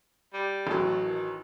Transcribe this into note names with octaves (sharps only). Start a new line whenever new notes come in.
G3
A1 F#3
A2
D#3